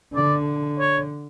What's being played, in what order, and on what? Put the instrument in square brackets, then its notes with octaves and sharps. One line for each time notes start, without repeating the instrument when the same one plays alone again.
[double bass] D3 [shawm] D5
[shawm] C#5